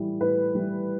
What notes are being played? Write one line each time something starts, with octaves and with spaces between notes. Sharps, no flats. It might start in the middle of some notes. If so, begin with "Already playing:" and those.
Already playing: A2 E3 G3
A2 B4
E3 G3